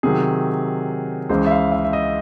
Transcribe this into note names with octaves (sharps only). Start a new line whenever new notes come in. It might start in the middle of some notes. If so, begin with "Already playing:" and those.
C3 D#3 F#3 G#4
C#2 C#3 E3 G#3 C5
E5
F5
E5
E5
D#5